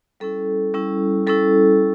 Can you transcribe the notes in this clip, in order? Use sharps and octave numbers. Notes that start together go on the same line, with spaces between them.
G3 C#4 E4 A4
G3 C#4 E4
G3 C#4 E4 A4